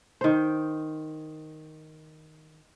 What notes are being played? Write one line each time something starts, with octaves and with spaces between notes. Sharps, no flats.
D#3 C5